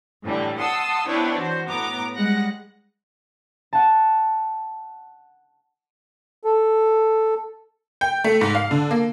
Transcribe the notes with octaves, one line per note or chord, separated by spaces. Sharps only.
A2 D3 E3 G3
F#5 A5 C6 D#6 E6
B3 C4 D4 E4 B4 C#5
E3 F#4 C5
A2 B3 A#5 D6
G3 G#3 F#5 A#6
F#5 A5
A4
G5
A3
G#2
F5
D3
A#3